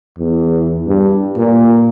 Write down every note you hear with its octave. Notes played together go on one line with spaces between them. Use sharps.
E2
G2
A#2